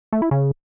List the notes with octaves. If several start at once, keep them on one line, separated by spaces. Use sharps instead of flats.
A3
E4
C#3